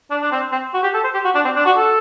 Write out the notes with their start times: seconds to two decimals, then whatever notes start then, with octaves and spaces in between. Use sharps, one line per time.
0.11 D4
0.22 D4
0.32 C4
0.52 C4
0.74 F#4
0.83 G4
0.94 A4
1.04 C5
1.14 G4
1.24 F#4
1.35 D4
1.45 C4
1.56 D4
1.66 F#4
1.76 A4